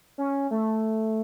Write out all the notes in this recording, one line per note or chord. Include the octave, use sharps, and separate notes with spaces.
C#4
A3